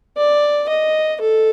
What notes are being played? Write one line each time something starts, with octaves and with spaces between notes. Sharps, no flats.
D5
D#5
A4